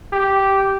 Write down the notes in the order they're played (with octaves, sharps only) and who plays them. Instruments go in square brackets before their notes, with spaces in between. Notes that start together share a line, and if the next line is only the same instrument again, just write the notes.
[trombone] G4